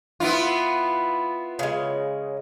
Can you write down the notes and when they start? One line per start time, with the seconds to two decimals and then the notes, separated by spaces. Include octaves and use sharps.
0.20 B3 E4 F4
1.59 C#3 G#3